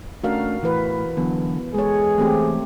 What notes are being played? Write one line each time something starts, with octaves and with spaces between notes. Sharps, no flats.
A3 C#4 D4 F#4 A#4 F5
A2 E3 B4
D3 E3 F#3 B3
E2 G#3 G#4 A4 C#5
E3 A3 C4 G4